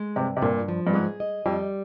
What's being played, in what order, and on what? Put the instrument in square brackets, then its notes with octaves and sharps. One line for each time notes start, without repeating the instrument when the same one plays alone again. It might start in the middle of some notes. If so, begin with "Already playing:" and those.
Already playing: [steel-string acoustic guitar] G#3
[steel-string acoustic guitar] G2 [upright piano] C3
[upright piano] C3
[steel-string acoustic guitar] G2 [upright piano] A#2
[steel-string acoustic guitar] F3
[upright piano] G2
[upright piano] G#2 [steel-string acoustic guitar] G#4
[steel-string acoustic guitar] D#5
[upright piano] F2 [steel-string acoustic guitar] G3